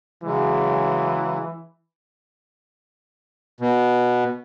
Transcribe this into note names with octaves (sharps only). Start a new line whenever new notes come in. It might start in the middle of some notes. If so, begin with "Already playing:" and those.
C#3 E3 F#3 G#3
B2